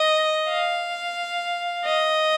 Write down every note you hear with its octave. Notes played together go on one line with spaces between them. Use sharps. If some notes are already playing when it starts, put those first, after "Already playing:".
Already playing: D#5
F5
D#5